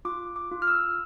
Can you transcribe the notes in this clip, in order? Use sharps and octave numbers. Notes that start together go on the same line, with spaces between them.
F4 D6
D6
F4
F6
E6